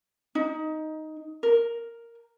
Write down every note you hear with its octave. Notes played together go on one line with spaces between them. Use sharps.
D#4
A#4